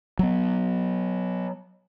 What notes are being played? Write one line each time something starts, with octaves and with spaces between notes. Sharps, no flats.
F#3 B3